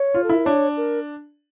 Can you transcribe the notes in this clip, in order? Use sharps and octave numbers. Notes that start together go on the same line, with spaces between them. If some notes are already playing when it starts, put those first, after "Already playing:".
Already playing: C#5
F4
A4
E4
A#4
D4 C#5
A#4